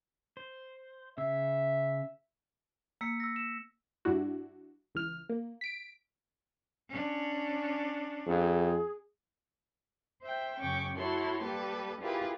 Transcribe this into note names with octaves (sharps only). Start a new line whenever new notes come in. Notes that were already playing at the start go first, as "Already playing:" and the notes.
C5
C#3 E5 E6
A#3 E6 B6 C#7
E6 A#6
E7
G2 G3 D4 E4 F#4
C#2 E3 F6
A#3
B6 D7
C#4 D4
F2 G#4
C5 E5 G5
F#2 C#3 C#4 G5 C#6 D6
E4 F#4 A4 C#5 C6
G3 A#3 G4 A4 B4
E4 F4 G4 G#4 A#4 B4